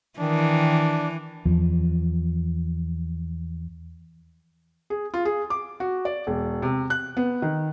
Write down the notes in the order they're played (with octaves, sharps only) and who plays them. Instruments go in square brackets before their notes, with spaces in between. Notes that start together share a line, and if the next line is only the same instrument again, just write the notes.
[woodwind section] D#3 [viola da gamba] E3 [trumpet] D4
[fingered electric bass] E2 F3
[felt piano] G#4
F4
G#4
D6
F#4
D5
E1
C3
F#6
B3
D#3